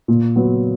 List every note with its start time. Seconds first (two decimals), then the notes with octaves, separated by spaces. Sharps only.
0.08 A#2
0.36 F#3 B3